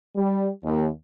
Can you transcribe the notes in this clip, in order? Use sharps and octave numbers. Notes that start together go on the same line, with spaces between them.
G3
D#2